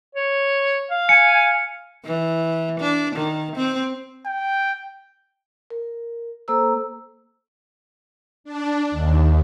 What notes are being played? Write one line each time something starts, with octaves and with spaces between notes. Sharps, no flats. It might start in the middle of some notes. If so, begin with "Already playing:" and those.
C#5
F5
G#5 C#7
E3
D4
D#3
C4
G5
A#4
A#3 A4 C5 A#5 E6
D4
D#2